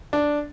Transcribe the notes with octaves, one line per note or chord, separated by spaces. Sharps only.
D4